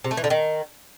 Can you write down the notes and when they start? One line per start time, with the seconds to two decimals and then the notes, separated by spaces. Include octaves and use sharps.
0.04 C3
0.11 A3
0.17 E3
0.24 D3
0.30 D#3